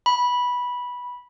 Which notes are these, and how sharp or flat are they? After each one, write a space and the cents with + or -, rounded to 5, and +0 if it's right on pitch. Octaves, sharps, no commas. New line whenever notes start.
B5 -10